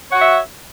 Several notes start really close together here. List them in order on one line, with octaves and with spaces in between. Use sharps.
C#5 F#5 F#4 E5